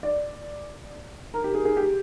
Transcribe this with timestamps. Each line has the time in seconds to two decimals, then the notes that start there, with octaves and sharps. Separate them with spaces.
0.03 D5
1.34 A#4
1.44 G4
1.55 G#4
1.65 G#4
1.77 G4